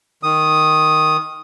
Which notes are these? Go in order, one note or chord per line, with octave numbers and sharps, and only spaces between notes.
D#3 D#6